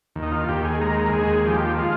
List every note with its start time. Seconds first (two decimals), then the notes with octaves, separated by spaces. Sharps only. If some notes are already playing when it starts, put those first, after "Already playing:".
0.16 D#2
0.23 D#4
0.32 F4
0.49 D#2 G4
0.64 G#4
0.81 G#3 A#4
1.13 D#2 G#4
1.46 F3 G4
1.78 G#3 F4